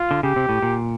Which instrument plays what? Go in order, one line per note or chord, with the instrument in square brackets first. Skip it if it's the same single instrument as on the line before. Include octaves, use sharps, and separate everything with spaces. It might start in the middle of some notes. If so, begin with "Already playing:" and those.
Already playing: [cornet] F4
[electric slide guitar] D3
[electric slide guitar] C#3 [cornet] G4
[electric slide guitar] C3
A2
A#2